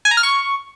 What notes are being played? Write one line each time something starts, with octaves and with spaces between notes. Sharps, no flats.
G#5
A#5
F6
C#6